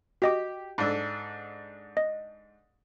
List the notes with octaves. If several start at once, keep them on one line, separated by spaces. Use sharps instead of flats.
F#4 G4 D#5 D6
G#2 D4 A4
D#5